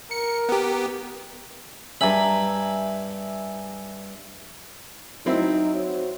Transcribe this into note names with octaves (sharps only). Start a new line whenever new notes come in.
A#4 C#7
B3 G4
G2 E5 G#5 A#5 B5
F#3 C4 D#4 E4
F#4 C5 C#5